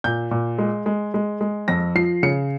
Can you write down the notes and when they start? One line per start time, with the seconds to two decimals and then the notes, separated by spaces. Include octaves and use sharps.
0.04 A#2 G6
0.31 A#2
0.58 G#3
0.86 G#3
1.14 G#3
1.41 G#3
1.68 F2 A#6
1.95 F3 C7
2.23 C#3 C#7